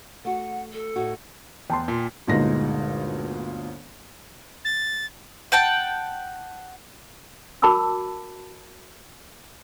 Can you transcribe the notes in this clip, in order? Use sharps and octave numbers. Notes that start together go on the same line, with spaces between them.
A3 F#4 F#5
A4
A2 D#4 F#4
E2 G5 A5 C6
A#2
G1 D2 A#2 G#3 D#4 A#6
A6
F#5 G5 A5
F#4 A#4 A5 B5 D6 E6